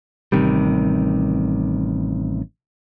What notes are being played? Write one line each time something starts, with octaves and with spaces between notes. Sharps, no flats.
A1 C3 D#3 G3